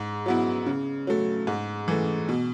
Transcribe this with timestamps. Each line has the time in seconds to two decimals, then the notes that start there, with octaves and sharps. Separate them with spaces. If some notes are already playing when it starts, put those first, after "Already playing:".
Already playing: G#2
0.26 F#3 B3 E4
0.66 C#3
1.07 F#3 A3
1.47 G#2
1.88 E3 A3
2.29 B2